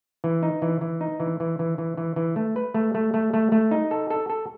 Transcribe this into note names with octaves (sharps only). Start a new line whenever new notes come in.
E3
D#4
E3
E3
D#4
E3
E3
E3
E3
E3
E3
A3
B4
A3
A3
A3
A3
A3
D#4
A4
A4
A4